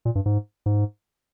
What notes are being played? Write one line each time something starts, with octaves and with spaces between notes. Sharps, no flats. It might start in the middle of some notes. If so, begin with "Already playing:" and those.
A#2
G2
G#2
G#2